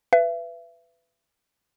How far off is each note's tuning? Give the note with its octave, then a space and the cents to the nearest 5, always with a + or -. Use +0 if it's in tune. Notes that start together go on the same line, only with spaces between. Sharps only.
B4 +15 E5 +35